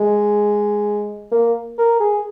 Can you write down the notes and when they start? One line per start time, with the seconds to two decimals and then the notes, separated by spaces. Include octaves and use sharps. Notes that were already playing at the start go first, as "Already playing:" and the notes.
Already playing: G#3
1.32 A#3
1.78 A#4
2.00 G#4